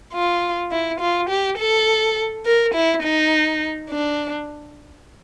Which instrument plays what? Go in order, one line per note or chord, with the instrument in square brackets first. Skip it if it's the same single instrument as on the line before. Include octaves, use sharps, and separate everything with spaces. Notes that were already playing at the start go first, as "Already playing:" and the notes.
[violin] F4
E4
F4
G4
A4
A#4
E4
D#4
D4